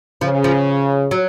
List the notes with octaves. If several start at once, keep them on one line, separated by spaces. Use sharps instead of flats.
C#3 F3
F3
F#3